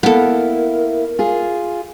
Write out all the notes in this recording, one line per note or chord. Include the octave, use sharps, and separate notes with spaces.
A#3 B3 E4 A4 A#4
F4 G#4